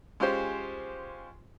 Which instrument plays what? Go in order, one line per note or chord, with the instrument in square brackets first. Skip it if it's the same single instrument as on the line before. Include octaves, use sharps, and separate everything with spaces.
[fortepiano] G#3 C#4 F4 G4 C5